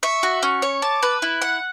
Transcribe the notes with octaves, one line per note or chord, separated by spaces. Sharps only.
E5 C#6
F#4
C#4 C#6
C#5
A5 D6
B4
E4 F#6
F#5